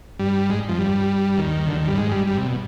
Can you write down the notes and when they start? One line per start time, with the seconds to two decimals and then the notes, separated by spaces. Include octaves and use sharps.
0.19 G2 G3
0.49 G#2 G#3
0.69 F2 F3
0.78 G2 G3
1.38 D#2 D#3
1.67 D2 D3
1.77 D#2 D#3
1.87 G2 G3
1.97 G#2 G#3
2.11 G2 G3
2.27 G2 G3
2.37 C3
2.46 B2